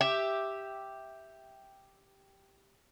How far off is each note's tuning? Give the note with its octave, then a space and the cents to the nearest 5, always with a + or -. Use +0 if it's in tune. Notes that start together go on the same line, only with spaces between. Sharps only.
G4 +0 E5 +0